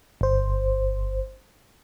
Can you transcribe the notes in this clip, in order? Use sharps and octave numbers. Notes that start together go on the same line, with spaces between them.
G1 C5